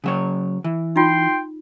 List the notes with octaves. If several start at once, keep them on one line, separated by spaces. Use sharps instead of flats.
C#3 F#3 C#5
E3
D#4 F4 G5 C6